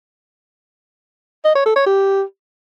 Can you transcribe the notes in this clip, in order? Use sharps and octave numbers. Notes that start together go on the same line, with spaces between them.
D#5
C#5
A4
C#5
G4